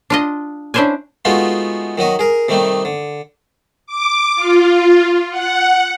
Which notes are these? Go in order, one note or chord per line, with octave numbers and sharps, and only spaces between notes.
D4 F4 D#5
C#4 D4 E4 C5 D5 G#5
G#3 A3 B3 D#4 F4 F#4
D#3 F#3 F#4 D#5
G#4 A#4
C3 D#3 G3 A3 D#4
D3
D6
F4
F#5